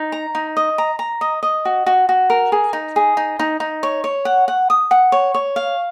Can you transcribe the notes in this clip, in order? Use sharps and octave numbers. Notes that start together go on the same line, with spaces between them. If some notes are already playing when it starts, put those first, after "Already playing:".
Already playing: D#4
A#5
D#4
D#5
A#5
A#5
D#5
D#5
F#4
F#4
F#4
A#4
G#4
D#4
G#4
D#4
D#4
D#4
C#5
C#5
F#5
F#5
D#6
F#5
C#5
C#5
F5